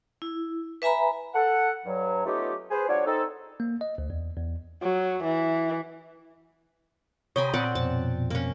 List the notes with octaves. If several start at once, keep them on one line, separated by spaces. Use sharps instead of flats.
E4
B4 E5 G#5 A#5 B5
A4 F#5
G2 F#3
A3 B3 C#4 D#4 F4 G4
G#4 B4 C5
F3 G3 D4 F#4 C#5
C4 D#4 A4
A#3
D#5
D2
E2
E2
F#3
E3
C3 C5 C#5 G5 G#5 A#5 B5 D#6
A#2 C4 D5 F#5
F2 B2 C4 A5
A#3 C#4